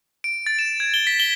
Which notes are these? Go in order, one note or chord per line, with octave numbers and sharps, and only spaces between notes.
D7
A6
E7
G#6
G7
B6
G7